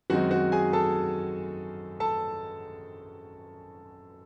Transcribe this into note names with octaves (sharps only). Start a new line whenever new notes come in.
F#2 D#3 G#3 C4 D#4 F#4 F#5
F#4 F#5
G#4 G#5
A4 A5
A4 A5